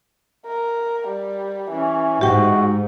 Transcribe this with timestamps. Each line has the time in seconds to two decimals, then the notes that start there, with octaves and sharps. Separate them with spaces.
0.46 A#4
1.08 G3
1.71 E3 C#4
2.21 G#2 F#4 G4 G5